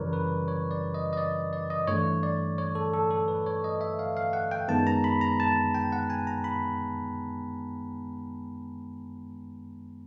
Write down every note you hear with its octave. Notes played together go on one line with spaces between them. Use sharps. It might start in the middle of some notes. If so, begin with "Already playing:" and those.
Already playing: F#2 C#3 E3 G3 A#4 B4 C#5 D5
B4
C#5
D5
D#5
D#5
D5
D5
D#5
G2 E3 A3 C#5
D5
C#5
A4
A4
A4
B4
C#5
D#5
E5
F5
F5
F#5
G5
F#2 D#3 G#3 B3 A5
A#5
B5
A#5
A5
G5
F#5
G#5
A#5
B5